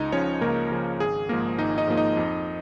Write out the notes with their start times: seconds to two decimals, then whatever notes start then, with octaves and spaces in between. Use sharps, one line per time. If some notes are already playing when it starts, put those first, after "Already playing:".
Already playing: C#2 D#4 D#5
0.12 C#3 F3 C#4 C#5
0.41 C#2 A#3 A#4
0.71 C#3 F3
1.00 G#1 G#4
1.29 G#2 F3 A#3 A#4
1.59 G#1 D#4 D#5
1.78 D#4 D#5
1.87 G#2 F3 A#3
1.97 D#4 D#5
2.17 F2